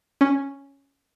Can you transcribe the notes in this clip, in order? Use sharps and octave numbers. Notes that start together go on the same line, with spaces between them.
C#4